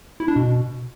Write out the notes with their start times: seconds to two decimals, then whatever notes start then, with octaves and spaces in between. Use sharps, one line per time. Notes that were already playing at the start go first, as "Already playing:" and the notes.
0.20 E4
0.28 D4
0.36 B2